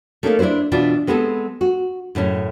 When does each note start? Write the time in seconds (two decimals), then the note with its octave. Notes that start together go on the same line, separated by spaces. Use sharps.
0.23 A3 A#3 C#4 D#4 A4 F5
0.39 D4 E4 G#4 B4 C5
0.72 B2 E3 D4 F4 F#4
1.07 G#3 B3 C4 G#4 A4
1.61 F#4
2.15 F#2 A2 C#3 C#4